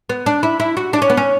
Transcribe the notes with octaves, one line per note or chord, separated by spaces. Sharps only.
B3
D4
E4
E4
F#4
D4
C#4
B3
C#4